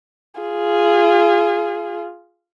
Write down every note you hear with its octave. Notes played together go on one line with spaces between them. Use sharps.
F4 G#4